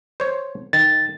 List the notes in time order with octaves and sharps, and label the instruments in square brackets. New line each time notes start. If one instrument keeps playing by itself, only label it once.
[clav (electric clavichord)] C5 C#5
[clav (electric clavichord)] D#3 [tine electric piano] A6